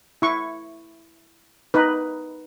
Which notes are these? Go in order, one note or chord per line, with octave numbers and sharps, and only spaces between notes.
E4 C#6
D#4 B4